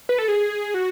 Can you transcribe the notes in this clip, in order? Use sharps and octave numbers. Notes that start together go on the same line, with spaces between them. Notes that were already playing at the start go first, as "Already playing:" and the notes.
B4
A4
G#4
F#4